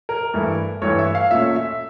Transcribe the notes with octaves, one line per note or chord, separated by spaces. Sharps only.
A#4
G2 E3 A3 E4
G2 E3 A3 E4 C#5
E5
F5
A#2 A3 C#4 E5
E5